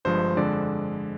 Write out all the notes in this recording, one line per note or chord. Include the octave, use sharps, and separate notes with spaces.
G1 G2 F3 G#3 C5
F2 D3 G#3 D5